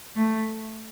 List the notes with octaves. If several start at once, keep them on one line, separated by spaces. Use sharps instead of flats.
A3